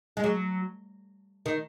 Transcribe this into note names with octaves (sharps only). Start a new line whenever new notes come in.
G#3
F#3
D#3